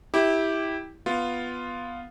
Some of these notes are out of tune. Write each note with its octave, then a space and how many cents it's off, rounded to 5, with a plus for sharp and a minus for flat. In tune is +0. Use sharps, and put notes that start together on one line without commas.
E4 -15 G4 +0
B3 +0 F4 +0